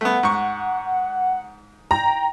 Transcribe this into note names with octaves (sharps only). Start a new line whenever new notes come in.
A3 B3 F#5
G#2 C#6
G5 A#5